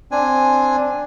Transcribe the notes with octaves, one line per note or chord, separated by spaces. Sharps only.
C4 D4 G#5